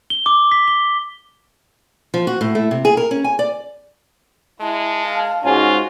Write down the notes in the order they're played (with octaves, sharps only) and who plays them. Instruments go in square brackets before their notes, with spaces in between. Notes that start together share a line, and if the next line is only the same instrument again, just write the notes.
[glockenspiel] G7
D6
B6
G7
[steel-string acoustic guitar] F3
F#4
A2
A3
C3
G#4
A#4
C#4
G#5
D5
[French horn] G#3 [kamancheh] E4 [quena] A5
[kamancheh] F5
[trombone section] G#2 C#4 [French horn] F4 [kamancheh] F#4 G#5